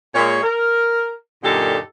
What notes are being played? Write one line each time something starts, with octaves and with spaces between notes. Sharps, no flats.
A#2 G#3 C#5
A#4
F#2 A#2 D3 D#4 G4 A4